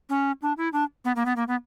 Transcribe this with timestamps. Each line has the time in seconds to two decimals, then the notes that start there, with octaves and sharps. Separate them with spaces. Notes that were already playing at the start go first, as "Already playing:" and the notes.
0.09 C#4
0.42 D4
0.57 E4
0.73 D4
1.04 B3
1.16 A#3
1.25 B3
1.36 A#3
1.48 B3